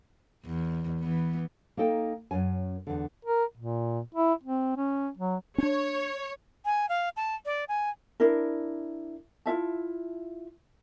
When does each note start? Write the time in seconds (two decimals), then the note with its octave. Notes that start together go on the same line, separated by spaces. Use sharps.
0.46 E2
1.00 E3 B3
1.77 A#3 D#4 A4 G5
2.31 F#2 C#4 G#5
2.87 E2 D3
3.25 A#4
3.57 A#2
4.15 E4
4.44 C4
4.77 C#4
5.17 F#3
5.58 C#4 D4 C#5
6.65 G#5
6.89 F5
7.16 A5
7.45 D5
7.68 G#5
8.20 D4 E4 A#4
9.46 E4 F4 E5 A5